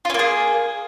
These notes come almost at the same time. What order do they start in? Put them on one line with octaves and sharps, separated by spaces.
F4 C#4 A#3 G#4